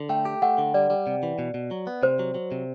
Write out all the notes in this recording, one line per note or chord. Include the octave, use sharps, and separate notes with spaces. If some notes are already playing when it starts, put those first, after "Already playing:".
Already playing: D3
A3 G5
G4
A3 F#5
D3
G3 D5
G3
C3
E3
B2
B2
F#3
B3
C3 C5
F#3
F#3
C3